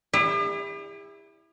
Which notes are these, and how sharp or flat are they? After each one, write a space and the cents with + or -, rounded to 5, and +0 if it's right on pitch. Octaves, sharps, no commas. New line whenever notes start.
E4 -5 G4 +45